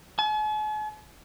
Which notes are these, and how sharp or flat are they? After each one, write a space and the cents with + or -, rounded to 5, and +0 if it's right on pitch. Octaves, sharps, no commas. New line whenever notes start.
G#5 +45